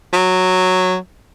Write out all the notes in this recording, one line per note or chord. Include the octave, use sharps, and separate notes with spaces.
F#3